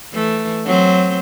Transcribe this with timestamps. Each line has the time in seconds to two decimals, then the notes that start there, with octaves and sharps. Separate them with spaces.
0.12 E3 A3
0.65 F#3 C4 C5